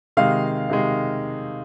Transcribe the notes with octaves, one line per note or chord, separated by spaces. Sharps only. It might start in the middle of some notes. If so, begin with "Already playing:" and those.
C3 D#3 G#3 F5
C3 D#3 G#3